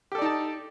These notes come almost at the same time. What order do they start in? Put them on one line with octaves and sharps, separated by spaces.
G4 A4 D5 D#4 A5